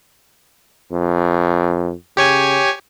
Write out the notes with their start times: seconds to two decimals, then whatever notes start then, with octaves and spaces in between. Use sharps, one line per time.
0.92 F2
2.17 C#3 G4 C#5 G#5